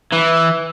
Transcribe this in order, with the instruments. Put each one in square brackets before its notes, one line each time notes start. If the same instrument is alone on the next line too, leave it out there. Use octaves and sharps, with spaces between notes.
[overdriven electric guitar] E3